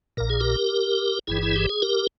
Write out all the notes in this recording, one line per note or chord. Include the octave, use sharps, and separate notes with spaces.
A#1 A#2 A#4
G#4
G4 A#4
G1 G2 E3 E4 G#4
E4
G4
G#4
G4 A#4